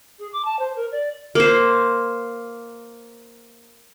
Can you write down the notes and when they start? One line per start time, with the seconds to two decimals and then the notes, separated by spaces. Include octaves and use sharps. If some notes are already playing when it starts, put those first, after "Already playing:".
0.19 G#4
0.32 D6
0.44 A5
0.59 C5
0.76 A#4
0.91 D5
1.35 A#3 C5